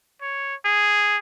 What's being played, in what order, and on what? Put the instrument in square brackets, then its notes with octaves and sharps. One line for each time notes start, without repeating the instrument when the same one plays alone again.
[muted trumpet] C#5
G#4